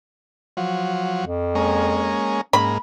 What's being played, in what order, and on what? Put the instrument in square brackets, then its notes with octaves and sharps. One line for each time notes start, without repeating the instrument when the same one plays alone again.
[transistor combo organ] F3 F#3
[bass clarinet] F2
[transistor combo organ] G#3 A#3 C#4
[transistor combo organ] G#2 A#3 [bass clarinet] C#4 [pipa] B5